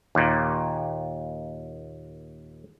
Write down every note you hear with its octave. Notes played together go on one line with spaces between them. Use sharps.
D#2 A#2